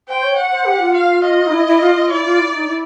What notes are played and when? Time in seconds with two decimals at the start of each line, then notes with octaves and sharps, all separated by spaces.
0.08 C5 G5
0.23 C#5
0.36 F#5
0.51 C5
0.65 G4
0.80 F4
0.94 F5
1.24 D#5
1.47 D#4
1.52 E4
1.66 E4
1.81 F4
1.95 F4
2.10 E4 D5
2.25 F4
2.39 E4
2.53 D#4
2.68 E4